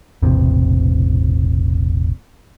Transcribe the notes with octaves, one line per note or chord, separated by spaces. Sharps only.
E1 A1 C3